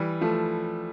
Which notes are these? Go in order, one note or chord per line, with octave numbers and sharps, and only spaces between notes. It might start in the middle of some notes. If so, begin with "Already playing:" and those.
Already playing: E3 G3
F3 A3